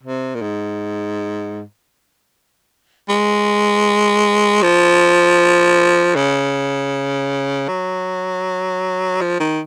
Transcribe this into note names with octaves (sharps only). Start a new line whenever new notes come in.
C3
A#2
G#2
G#3
F3
C#3
F#3
F3
D#3